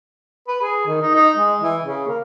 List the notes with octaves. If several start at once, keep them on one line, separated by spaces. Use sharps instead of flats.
B4
G#4
D#3
D#4
D#4
G#3
E3
C#3
A#3